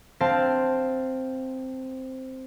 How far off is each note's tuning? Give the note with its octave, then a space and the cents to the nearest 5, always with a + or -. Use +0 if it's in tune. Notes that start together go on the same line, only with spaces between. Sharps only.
C4 +0 F5 +0 A5 +0